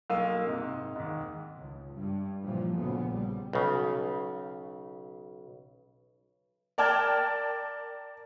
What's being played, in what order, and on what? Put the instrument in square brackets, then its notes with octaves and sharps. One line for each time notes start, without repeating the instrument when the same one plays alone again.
[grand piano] B1 A#3 F5 E6 D#7
G#2 C3
D#2 G#2
[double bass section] C#2
G2
A#2 C#3 E3 F3 G3
D2 A#2 C#3 F3 B3
A#1 G3
[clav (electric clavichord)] B1 C#3
[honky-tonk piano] A#4 D5 G5 A5 F6 G#6